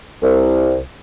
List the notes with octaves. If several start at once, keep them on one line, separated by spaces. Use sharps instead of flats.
C2